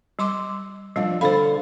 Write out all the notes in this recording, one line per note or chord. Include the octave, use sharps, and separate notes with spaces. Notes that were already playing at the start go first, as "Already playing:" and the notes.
G3 C6 D6
F3 G3 D4
D3 A4 C5 F5 B5